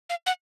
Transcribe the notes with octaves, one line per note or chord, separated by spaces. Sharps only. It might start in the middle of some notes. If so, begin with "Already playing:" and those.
F5
F#5